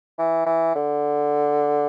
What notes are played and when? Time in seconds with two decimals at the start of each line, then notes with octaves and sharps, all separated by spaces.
0.19 E3
0.46 E3
0.75 D3